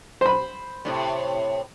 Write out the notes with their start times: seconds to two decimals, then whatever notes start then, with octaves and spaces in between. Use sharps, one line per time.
0.21 C5 B5
0.85 F#2 A2 C3